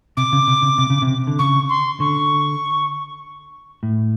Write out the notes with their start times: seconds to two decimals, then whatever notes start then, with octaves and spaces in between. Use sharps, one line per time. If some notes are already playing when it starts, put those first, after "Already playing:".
0.17 C3 D6
0.33 C#3
0.48 C3
0.62 C#3
0.78 C3
0.90 C#3
1.02 C3
1.27 D3
1.38 C#3 C#6
1.69 C6
2.00 D3 C#6
3.83 A2